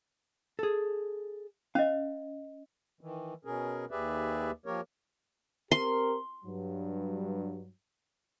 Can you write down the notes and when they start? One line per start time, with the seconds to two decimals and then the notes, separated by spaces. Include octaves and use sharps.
0.59 G#4 A4
1.75 C#4 D#5 F5
3.01 D#3 E3
3.45 B2 C#4 G#4 A#4
3.91 D#2 G4 G#4 B4 D5 E5
4.66 F3 A#3 G4 A#4 C#5
5.72 C4 G4 A#4 C6
6.44 G2 F#3